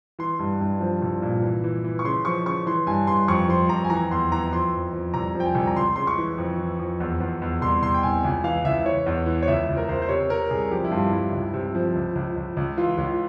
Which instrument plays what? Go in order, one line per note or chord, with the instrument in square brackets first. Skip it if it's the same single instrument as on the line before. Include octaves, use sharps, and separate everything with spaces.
[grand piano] E3 C6
G2
G2
F3
C2
A#2
E3
E3
E3
C#6
C#3 C6
F3 C#6
C#3 C#6
E3 C6
G2 G#5
G2 C6
F2 C#6
F3 C6
F2 A#5
G#5
E3 A#5
E2 C6
E3 A#5
F2 C6
F2
F2
C2 A#5
F3
G5
G#5
C2
A#5
C#2 C6
C#3 C6
C#6
E3
F2
E3
F2
E2
E2
E2
C2 C6
C2 C6
G5
C2 G#5
C#2 G#5
E3 F5
C#2 E5
E3 C#5
E2
E3
C#5
C#2 E5
C#2
A#4
C#2 C5
C5
C3 C#5
C3 A#4
C2 G#4
F3 G4
E4
G2 F4
G2 E4
C#2
C3
F3
C#2
C#2
C#2
C#2
E3 F4
C#2 F4